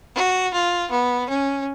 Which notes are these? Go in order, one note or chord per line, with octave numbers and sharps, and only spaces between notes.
F#4
F4
B3
C#4